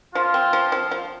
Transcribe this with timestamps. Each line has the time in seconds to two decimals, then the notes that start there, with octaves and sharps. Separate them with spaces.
0.15 F3 F4
0.34 C4
0.53 F3
0.72 F3
0.91 F3